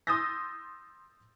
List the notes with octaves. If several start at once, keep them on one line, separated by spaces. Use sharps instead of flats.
C6 D#6 E6 G6 A6 A#6